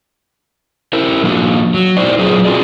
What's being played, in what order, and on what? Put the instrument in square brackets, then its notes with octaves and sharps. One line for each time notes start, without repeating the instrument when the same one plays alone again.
[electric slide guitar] E4 A#4 C5
F3 A#3 D4 F#4
F#3
D#4 E4 C5 D5
F#3 F4 G#4 B4 C5
C4 D4 F4 F#4 G#4 D5